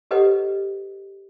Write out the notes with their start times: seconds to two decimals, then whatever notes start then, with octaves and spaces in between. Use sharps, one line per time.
0.11 G4 A4 B4 C#5 D#5 F#5